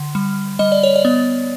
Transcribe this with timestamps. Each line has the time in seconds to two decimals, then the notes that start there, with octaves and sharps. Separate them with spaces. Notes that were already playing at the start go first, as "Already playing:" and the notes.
Already playing: D3
0.15 G3
0.59 G3 D#5
0.72 D5
0.83 C#5
0.96 D5
1.05 B3